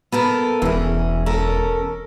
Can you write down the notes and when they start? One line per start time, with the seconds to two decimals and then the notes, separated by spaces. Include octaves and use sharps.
0.12 B3 A4 A#4
0.62 E1 E3 C#4 G#4
1.26 C#4 A4 A#4